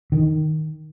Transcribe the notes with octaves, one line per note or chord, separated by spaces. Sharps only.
D#3